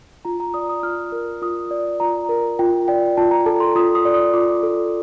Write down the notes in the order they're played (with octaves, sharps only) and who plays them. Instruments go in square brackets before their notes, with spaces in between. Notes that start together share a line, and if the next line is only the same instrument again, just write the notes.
[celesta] F4 A#5
A#5
D5 D#6
D#6
F4 F6
A#4
F4 D#6
D5
F4 A#5
A#4
F4 G5
D5 G5
F4 A5
A#5
A4 A5
C6
F4 D#6
D#6
D5
D#6
F4 D6
A4